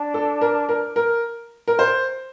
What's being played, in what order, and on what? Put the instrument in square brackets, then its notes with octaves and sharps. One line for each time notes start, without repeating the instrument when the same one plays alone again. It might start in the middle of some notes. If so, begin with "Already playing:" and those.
Already playing: [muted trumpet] D4
[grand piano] A4
A#4
A#4
A#4
A#4
C5